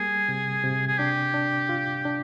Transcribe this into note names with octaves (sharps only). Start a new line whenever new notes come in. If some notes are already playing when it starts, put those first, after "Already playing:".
Already playing: G3 A#3 G#4
C3
C3
G#4
D4 G4
D4
F4
D4